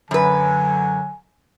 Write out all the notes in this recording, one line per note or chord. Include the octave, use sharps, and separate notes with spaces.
F#2 D3 F#3 B4 G#5